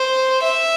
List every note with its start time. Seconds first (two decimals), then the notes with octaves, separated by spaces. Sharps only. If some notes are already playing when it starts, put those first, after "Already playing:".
Already playing: C5
0.43 E5